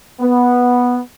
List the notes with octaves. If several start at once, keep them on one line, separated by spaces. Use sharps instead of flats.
B3